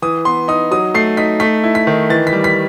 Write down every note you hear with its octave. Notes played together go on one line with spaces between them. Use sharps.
E3 D#6
B3 C6
D#4 D#6
F#3 D#6
A3 C7
D#4 B6
A3 B6
E4
B6
D#3
E3 A6
B6
G3
B6